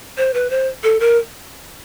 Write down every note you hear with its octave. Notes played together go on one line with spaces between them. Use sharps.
C5
B4
C5
A4
A#4